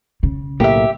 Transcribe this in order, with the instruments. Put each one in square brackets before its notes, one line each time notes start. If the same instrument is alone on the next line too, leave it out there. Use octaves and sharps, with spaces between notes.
[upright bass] C#3
[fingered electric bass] B1 A2 A#3 [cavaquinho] G4 E5